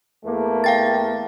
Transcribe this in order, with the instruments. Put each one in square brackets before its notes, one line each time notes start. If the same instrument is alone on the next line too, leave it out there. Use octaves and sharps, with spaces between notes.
[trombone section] E2 A3 A#3
[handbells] F5 G5 A6